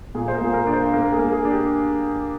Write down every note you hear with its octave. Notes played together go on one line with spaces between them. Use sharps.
A#2 G#4
C5
A#4
A#2 G#4
A#4
D4
C5
A#3
A#4
G#4
A#3
G#4
D4
G4